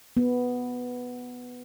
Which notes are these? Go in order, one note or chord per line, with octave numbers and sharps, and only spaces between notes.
B3